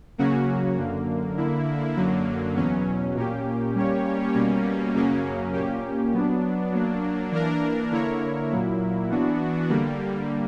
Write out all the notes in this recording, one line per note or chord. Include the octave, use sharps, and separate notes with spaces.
C#3 F#3 A#3 C#4 F#4
F#2 D3 A#3
D3 A#3 E4
F#2 D3 F#3 A#3
E2 B2 F#3 C#4
A#2 A#3 C#4 G4
G3 A#3 C#4 G4 C#5
B2 G3 A#3 C#4
F#2 C#3 F#3 A#3 C#4
A#2 A#3 C#4 G4
F#3 B3 D4
F#3 A#3 D4
E3 A#3 D4 A#4
D3 A#3 E4 A#4 C#5
A#2 F#3 A#3 E4
E3 B3 D4 F#4
D3 G3 A#3